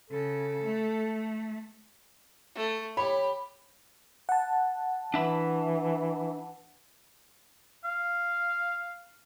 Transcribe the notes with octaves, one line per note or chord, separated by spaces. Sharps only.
C#3 A4
A3
A3
G4 C#5 B5
F#5 A5
E3 D4 E5 B5
F5